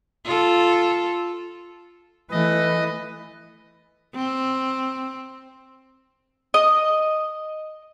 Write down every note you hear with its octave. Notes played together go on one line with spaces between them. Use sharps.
F4 A4
E3 A3 B4 D#5
C4
D#5